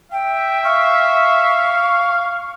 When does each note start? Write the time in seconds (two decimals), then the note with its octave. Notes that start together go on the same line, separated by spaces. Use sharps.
0.12 E5 G5
0.64 F5 C#6